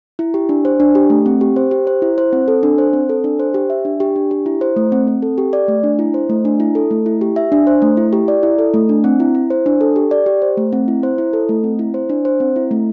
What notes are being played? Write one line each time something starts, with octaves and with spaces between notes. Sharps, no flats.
E4
G4
D4
C5
D4
G4
A3
C4
G4
C5
G4
C5
E4
C5
C4
A4
D4
C5
C4
A4
D4
C5
G4
E5
D4
G4
D4
G4
E4
C5
A3
C4
C4
A4
G4
D5
A3
D4
E4
C5
A3
D4
E4
A4
A3
E4
G4
E5
D4
C5
A3
E4
G4
D5
E4
A4
A3
D4
C4
E4
E4
C5
D4
A4
G4
D5
G4
C5
A3
C4
E4
C5
E4
A4
A3
C4
E4
C5
D4
C5
C4
E4
A3